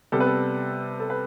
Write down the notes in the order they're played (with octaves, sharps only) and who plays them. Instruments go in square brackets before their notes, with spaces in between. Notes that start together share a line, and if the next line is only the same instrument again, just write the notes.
[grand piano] C3 G3 B3 A4
B4
A4
A4
B4